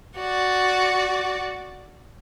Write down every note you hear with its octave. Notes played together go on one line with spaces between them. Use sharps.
F#4 D5